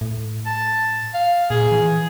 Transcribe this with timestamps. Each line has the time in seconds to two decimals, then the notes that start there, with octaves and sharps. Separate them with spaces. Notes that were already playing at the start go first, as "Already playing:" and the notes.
0.01 A2
0.46 A5
1.14 F5
1.50 A#2 G#4
1.71 E3